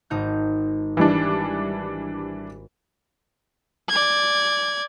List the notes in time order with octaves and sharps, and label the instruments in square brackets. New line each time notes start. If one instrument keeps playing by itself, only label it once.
[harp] G#1 D#4 G6
[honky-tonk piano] E3 G3 D4
[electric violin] D5 G#6